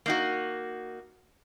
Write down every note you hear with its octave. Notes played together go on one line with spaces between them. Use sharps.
A#3 D#4 F#4